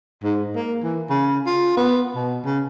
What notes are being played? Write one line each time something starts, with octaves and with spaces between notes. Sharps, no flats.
G#2
A#3
E3
C#3
F4
B3
B2
C#3